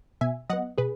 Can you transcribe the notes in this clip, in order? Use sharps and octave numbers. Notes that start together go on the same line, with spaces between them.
B2 E5 G#5
F#3 B3 D#5 F#5
B2 G#4 B4